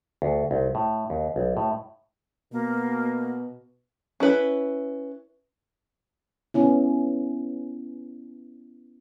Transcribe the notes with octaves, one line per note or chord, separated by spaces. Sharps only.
D2
C2
A2
D#2
B1
A2
B2 A#3
C#4 E4 B4
B3 C#4 E4